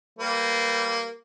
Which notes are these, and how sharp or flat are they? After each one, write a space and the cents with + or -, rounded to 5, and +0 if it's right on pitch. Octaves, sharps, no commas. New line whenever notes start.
G3 -15 A#3 -10 B4 +0